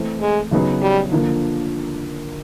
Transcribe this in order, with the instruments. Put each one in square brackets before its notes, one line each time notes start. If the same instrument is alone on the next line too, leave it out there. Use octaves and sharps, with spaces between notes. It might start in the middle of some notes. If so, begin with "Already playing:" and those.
Already playing: [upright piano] E3 A3 C4
[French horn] G#3
[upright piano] C#3 F#3 B3 D#4 G#4
[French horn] G3
[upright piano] D3 F3 A#3